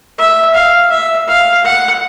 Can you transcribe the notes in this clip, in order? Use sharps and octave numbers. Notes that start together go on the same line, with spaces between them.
E5
F5
E5
F5
F#5